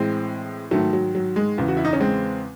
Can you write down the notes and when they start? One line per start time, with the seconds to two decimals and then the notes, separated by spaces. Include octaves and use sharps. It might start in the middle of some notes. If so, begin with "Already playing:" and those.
Already playing: A2 E3 G#3 C4
0.71 G#2 D#3 F#3 A3
0.93 F#3
1.15 F#3
1.36 G#3
1.58 E2 C#3 E3
1.68 F#4
1.77 E4
1.85 D#4
1.93 C#4
2.00 G#3 C4